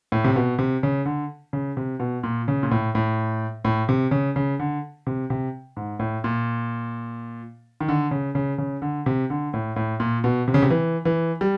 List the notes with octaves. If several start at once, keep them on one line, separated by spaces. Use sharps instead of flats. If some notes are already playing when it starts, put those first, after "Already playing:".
A2
C3
B2
C3
C#3
D3
C#3
C3
B2
A#2
C#3
A#2
A2
A2
A2
C3
C#3
C#3
D3
C3
C3
G#2
A2
A#2
D#3
D3
C#3
C#3
C#3
D3
C3
D3
A2
A2
A#2
B2
C3
C#3
C3
E3
E3
G3